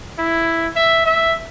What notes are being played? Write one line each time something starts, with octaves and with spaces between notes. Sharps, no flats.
E4
E5
E5